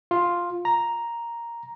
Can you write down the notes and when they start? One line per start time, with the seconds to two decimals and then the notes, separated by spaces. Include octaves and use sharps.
0.11 F4
0.65 A#5